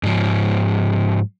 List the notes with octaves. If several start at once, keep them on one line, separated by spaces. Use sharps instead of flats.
G#2 F3